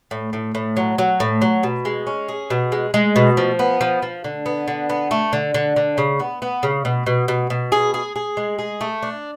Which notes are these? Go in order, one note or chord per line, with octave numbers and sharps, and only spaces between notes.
A2
A2
A2
F#3
F#3
A2
F#3
B2
G#3
C#4
G#4
B2
G#3
G#3
B2
F3
B3
F3
F3
D3
B3
D3
B3
A3
D3
D3
D3
C#3
B3
B3
C#3
B2
B2
B2
B2
G#4
G#4
G#4
G#3
G#4
A3
D4